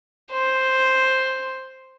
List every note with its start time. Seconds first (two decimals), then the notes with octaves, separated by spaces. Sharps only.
0.31 C5